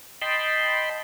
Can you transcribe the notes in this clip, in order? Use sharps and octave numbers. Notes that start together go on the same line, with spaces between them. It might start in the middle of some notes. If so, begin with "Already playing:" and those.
D#5 G5 A5 B5 C6